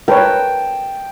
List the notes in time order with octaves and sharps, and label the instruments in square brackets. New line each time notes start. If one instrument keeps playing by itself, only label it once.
[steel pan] A#4 B4 C#5 [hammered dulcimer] G5 A5